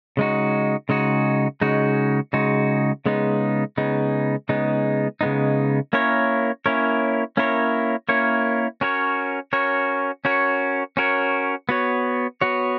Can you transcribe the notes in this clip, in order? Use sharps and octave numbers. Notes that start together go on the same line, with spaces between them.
C#3 G#3 D#4 F#4
C#3 G#3 D#4 F#4
C#3 G#3 D#4 F#4
C#3 G#3 D#4 F#4
C#3 G#3 B3 D#4
C#3 G#3 B3 D#4
C#3 G#3 B3 D#4
C#3 G#3 B3 D#4
A#3 C#4 E4 A#4 C#5
A#3 C#4 E4 A#4 C#5
A#3 C#4 E4 A#4 C#5
A#3 C#4 E4 A#4 C#5
C#4 F#4 A#4 C#5
C#4 F#4 A#4 C#5
C#4 F#4 A#4 C#5
C#4 F#4 A#4 C#5
B3 F#4 C#5
B3 F#4 C#5